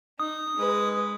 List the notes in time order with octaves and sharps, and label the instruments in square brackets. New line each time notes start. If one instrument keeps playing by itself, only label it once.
[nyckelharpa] D#4 [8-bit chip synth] D#6
[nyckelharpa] G#3 B4